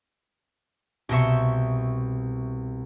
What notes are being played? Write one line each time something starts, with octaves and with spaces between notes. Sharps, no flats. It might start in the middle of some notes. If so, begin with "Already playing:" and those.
C2 B2 C5 E5 C#6